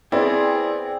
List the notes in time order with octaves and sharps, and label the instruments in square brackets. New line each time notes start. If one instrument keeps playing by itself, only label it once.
[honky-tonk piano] B3 D5 [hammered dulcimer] C4 [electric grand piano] E4 [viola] G#4